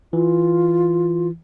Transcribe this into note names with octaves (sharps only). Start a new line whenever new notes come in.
E3 F4